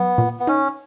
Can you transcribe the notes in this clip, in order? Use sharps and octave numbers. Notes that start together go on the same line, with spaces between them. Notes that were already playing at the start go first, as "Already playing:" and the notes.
Already playing: F#3 B3
A#2
B3
C#4 D#4